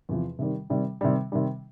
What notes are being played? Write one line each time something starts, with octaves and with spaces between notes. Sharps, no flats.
E2 C3 F3
C3 D#3 G3
C3 D#3 G3
C3 D#3 G3
C3 D#3 G3